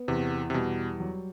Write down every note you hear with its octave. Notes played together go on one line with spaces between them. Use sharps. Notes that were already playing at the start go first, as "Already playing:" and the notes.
Already playing: B3
E2 C3
C3
B2 G3
F#3